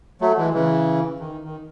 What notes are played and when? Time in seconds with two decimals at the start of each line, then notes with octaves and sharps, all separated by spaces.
0.21 F#3 A3
0.37 E3 G#3
0.54 C#3 E3
1.20 D#3
1.44 D#3